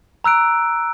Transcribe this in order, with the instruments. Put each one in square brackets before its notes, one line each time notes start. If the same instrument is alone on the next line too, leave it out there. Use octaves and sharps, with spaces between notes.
[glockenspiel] A#5 E6 F#6 D7